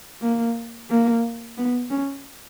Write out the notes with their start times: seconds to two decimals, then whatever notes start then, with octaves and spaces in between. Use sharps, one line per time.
0.22 A#3
0.90 A#3
1.58 B3
1.90 C#4